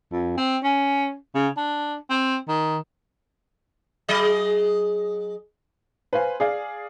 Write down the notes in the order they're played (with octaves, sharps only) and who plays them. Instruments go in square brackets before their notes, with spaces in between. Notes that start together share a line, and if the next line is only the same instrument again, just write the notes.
[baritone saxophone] F2
C4
C#4
C#3
D4
C4
D#3
[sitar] F#3 G#4 D#5
[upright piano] B4 C5 F5 G#5
G#4 D5 F5